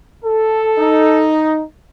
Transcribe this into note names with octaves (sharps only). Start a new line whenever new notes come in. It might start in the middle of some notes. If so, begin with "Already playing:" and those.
A4
D#4